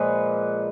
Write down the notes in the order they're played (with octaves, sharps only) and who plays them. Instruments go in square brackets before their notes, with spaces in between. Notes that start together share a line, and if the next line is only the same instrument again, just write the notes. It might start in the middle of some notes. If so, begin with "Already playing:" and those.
Already playing: [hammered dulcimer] A#2 F3 G#3 B4